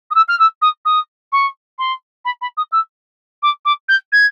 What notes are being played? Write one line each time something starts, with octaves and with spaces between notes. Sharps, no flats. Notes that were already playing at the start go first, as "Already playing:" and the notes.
D#6
E6
F6
E6
D#6
D#6
C#6
C6
B5
B5
D#6
E6
D6
D6
G6
G#6